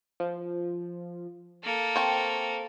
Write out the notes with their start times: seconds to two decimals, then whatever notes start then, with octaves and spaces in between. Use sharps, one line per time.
0.20 F3
1.64 A#3 A4
1.96 C4 G5 A5 C#6